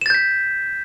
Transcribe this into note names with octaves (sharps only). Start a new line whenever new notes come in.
G6 A6 B6 E7